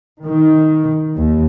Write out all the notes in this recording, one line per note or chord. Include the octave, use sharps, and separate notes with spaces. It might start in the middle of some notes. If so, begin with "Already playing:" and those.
D#3
D#2